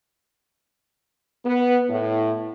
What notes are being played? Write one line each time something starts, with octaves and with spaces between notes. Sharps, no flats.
B3
A2